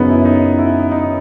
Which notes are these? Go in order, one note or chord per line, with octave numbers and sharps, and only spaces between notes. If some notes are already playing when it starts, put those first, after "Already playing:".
Already playing: F#2 C#3 F#3 B3 C#4 D#4
E4
D#4
E4
D#4